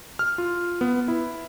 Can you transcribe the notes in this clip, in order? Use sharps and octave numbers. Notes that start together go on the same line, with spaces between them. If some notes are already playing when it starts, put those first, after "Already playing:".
F6
F4
B3
E4